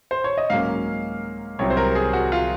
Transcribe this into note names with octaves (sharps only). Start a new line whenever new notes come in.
C5
C#5
D#5
G#2 F#3 A#3 C#4 F5
C2 C3 F#3 C4 C#5
C5
A#4
G#4
F#4
F4